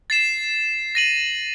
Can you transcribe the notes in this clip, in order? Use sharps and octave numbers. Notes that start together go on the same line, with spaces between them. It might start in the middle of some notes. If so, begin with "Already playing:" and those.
A6 C7 E7
A#6 D#7 F#7